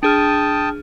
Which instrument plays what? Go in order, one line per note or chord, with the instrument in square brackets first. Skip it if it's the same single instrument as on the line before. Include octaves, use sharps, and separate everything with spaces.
[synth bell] D4 G#4 F6 [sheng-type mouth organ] G5 A5 D#6